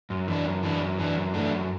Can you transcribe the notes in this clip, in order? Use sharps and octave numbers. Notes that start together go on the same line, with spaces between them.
F#2
E3 D4
F#2
E3 D4
F#2
E3 D4
F#2
E3 A3 D4
F#2